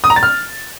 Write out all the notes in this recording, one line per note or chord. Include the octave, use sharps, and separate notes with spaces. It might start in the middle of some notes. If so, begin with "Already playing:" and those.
D#6
A#5
A6
F6